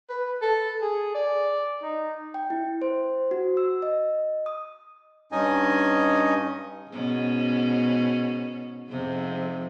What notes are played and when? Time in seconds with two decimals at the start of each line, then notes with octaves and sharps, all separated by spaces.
0.09 B4
0.42 A4
0.82 G#4
1.15 D5
1.82 D#4
2.34 G5
2.50 E4
2.82 C5
3.31 F#4
3.57 E6
3.82 D#5
4.46 D#6
5.32 G2 C#4 D#4 D#5 G#5
6.90 G#2 B2 C#4
8.90 F2 G#2 C3